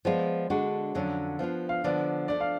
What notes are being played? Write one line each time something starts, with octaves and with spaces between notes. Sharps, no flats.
F3 G#3 B3 F4 D5
D3 G#3 D4 F#4
F2 D3 F#3 C#4 D5
F3 B3 D4 F4 F5
F5
D3 F3 B3 D5
F3 A3 D4 D5
F5